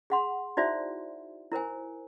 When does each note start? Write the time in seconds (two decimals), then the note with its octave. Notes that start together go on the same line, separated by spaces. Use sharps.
0.10 G#4 F#5 C6
0.57 D#4 E4 F#4 C5 D5 E5
1.51 E4 A#4 C5 G#5